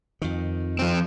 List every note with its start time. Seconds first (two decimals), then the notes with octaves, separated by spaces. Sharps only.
0.22 F2 D#3
0.79 F3 C4